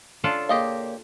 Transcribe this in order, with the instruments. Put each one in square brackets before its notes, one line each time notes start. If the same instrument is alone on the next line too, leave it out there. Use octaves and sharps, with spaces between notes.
[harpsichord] D3 C#4 [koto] D4 F4 A4
[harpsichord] A#2 C#3 A#3 [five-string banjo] G4 D#5 F5